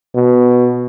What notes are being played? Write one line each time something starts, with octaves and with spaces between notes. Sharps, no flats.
B2